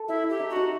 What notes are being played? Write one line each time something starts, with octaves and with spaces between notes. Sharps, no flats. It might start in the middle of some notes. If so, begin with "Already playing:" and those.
Already playing: A4
E4 E5
E5
G4
D#4
F#4
D#4